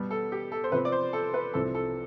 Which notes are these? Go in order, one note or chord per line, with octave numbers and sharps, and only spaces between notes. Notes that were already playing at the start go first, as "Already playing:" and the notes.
Already playing: B2 G3 B3
A4
G4
A4
C5
C3 F3 C4 B4
D5
C5
A4
B4
C2 C3 F3 C4 A4
A4